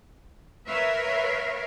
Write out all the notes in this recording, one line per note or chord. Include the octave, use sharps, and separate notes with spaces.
A#4 B4 C#5 E5 F5